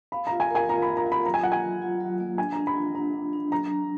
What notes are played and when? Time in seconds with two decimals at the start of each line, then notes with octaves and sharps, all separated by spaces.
0.12 F5 B5
0.27 F4 A#5
0.40 G#5
0.50 A#4
0.55 G#5
0.69 F4 A#5
0.82 B5
0.88 F4
0.97 A#5
1.06 F4
1.12 B5
1.26 F#3 A#5
1.34 G#5
1.44 F4 F#5
1.52 G#5
1.63 F#3
1.82 F4
2.01 F#3
2.20 A#3
2.38 D4 G#5
2.53 A#5
2.58 D4
2.67 B5
2.76 F4
2.95 D4 A#5
3.14 D4
3.33 D4
3.51 F#3 A#5
3.70 D4